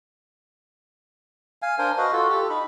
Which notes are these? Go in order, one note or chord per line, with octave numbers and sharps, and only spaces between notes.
F5 G#5
D4 A#4 C5 G#5
F#4 B4 D#5 F5
F4 F#4 A4
G4 A4
D#4 B5